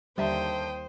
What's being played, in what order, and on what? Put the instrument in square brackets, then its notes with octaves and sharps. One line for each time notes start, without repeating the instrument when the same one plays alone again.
[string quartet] D#2 G5 D#6 [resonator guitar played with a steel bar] D3 E5 A5 [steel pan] G3 [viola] C5